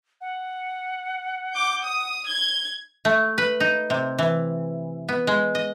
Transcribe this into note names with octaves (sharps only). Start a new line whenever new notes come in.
F#5
D6 G6
D#6
G#6 G7
A3
B4
D#4
C3
E3
B3
G#3
D#5